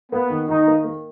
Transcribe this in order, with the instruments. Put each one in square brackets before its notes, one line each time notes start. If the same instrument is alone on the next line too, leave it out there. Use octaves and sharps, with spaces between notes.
[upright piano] A#3 [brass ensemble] B3
[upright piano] D#3
[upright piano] D#3 [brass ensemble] D#4
[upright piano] A#3
A#3